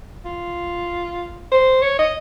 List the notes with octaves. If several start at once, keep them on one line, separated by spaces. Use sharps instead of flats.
F4
C5
C#5
D#5